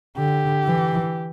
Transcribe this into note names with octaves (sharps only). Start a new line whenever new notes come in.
D3 G4
E3